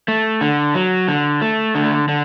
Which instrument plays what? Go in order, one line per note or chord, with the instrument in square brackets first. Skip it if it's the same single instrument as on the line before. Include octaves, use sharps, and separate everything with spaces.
[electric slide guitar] A3
D3
F#3
D3
A3
D3
D3